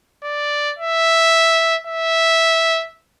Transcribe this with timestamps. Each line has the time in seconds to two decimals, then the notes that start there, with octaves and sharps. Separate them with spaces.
0.24 D5
0.79 E5
1.87 E5